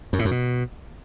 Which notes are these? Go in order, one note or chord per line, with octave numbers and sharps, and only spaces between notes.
F#2
A2
F#2
B2